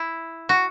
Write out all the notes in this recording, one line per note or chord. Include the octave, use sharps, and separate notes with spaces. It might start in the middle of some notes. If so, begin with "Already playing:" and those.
Already playing: E4
F#4